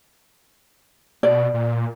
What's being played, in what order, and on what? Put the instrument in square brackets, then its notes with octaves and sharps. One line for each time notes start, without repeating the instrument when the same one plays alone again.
[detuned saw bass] B2 [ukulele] D5
[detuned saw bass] A#2